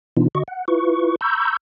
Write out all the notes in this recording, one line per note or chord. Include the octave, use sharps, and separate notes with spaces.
B2 E3 B3 D4 D#4 F4
D3 F#4 D#5 C#6
F#5
E4 F4 B4 C#6
A#5 B5 C#6 E6 G6